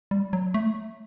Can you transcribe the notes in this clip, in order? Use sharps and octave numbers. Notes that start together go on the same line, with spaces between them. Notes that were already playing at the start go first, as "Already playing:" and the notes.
G3
F#3
A3